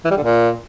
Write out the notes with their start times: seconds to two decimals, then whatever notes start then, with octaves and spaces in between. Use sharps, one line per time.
0.05 E3
0.11 G3
0.17 D3
0.23 A#2